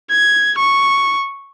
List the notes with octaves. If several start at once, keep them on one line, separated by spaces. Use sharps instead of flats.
G#6
C#6